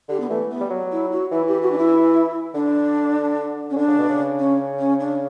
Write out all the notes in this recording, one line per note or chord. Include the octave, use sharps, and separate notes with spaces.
D3 G4
B3
E3 A3
B3
G3
F#3
E4
F#4
E3 E4
G4
F#4
D4
E4
D3 D4
C#4
D3 D4
C#3
B2
C#3
C#4
C#4
D4